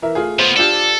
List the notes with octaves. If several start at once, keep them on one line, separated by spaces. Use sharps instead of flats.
E3 A#4 E5
A3 F4 G#4
B3 F4 C5
D4 F4 G4 A4